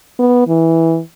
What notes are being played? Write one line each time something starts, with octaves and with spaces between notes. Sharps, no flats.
B3
E3